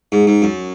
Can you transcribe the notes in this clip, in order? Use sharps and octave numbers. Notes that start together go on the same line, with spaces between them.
G#2
G#2
F#2